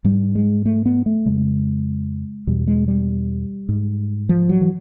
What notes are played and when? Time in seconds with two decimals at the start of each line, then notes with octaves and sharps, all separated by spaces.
0.04 G#2 G3
0.35 G#3
0.66 A3
0.86 B3
1.06 A3
1.26 F2 C#3 G#3
2.47 E2 B2 G3
2.67 G#3
2.88 G3
3.69 G#2
4.29 F3
4.49 F#3
4.61 E3